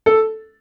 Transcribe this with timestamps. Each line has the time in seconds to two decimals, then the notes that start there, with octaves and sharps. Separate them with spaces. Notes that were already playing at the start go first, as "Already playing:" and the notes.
0.06 A4